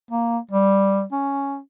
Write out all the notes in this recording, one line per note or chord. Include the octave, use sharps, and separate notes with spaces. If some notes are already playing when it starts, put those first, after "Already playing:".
A#3
G3
C#4